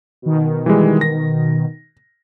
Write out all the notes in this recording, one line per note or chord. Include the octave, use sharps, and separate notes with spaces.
B2 D#3
E3 G3 G#3
A#6